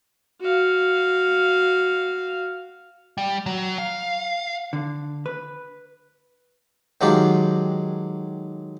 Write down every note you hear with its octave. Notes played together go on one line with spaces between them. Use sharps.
F#4 F5
G3
F#3
F5
D3
B4
D#3 F#3 G#3 D4 F4 G4